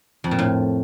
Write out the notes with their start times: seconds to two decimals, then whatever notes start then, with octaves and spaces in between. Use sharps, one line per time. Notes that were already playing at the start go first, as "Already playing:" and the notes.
0.24 F2
0.31 A#2
0.39 A2